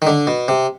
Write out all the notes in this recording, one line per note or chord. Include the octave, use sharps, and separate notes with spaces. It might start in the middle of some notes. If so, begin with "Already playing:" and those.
D#3
D3
B2
C3